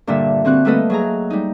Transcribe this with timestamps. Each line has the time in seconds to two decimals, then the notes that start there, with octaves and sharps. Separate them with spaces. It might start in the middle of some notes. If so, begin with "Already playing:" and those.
0.07 G2 A#2 D3 G3 A#3 E5
0.45 D3 C4 F#4 F#6
0.65 G3 A3 A#3 A4 B4 D#5
0.90 F#3 G#4 A#5
1.30 G3 D#4